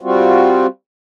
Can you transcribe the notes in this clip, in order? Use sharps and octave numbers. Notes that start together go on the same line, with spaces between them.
G3 C4 F4 F#4